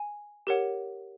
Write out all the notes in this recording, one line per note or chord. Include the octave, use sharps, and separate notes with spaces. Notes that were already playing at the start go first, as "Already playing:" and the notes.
Already playing: G#5
G4 A#4 C#5 F#5